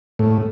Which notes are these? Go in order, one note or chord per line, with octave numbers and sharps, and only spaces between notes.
A2